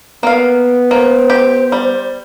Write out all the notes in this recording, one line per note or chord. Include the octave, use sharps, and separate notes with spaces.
A#3 B3 F5
A#3 C5
G4
G3